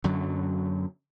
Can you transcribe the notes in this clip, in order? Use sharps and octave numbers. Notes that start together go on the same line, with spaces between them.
F#2 D3 F#3